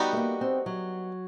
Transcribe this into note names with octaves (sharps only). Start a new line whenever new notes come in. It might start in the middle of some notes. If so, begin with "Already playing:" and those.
Already playing: G3 B3 D#4 F#4
A3
A#3
C4
F#3